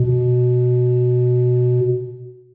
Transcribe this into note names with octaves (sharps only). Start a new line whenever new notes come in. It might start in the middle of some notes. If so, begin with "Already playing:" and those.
Already playing: B2